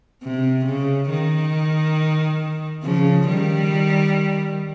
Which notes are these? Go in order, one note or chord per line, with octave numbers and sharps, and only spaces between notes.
C3
C#3
D#3
C#3 F3
D#3 G3